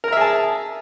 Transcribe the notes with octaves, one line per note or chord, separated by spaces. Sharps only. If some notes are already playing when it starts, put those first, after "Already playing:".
G#4 A#4 E5 A5 A#5